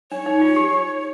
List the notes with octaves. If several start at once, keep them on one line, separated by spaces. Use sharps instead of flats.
D4 C#5
D#4
F4
G4